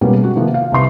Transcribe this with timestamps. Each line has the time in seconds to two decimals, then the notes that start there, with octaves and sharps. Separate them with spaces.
0.01 B2 G3 G#3 A#3 B3 C#4
0.19 G#3 F#4
0.35 C3 D#3 F3 A#3 B3
0.54 F5
0.72 C2 C3 B4 C6 C7